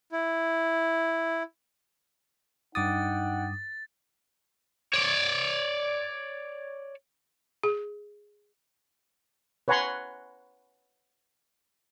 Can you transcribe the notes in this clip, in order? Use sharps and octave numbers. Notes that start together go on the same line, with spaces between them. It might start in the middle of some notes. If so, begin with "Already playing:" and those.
E4
G2 D#4 F#5 G5 D6 D#6 A6
C#5 D5
G#4
B4 C#5 F#5 G#5 A#5 C6